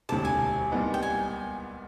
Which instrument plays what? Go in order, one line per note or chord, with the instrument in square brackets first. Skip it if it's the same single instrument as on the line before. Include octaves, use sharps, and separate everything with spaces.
[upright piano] E1 D2 C3 [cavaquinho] A5
[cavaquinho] G#5
[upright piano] C2 A#2 G3 B3 D#4
[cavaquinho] G5
G#5